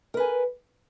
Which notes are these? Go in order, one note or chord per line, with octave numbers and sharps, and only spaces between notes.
A#4 B4 G#5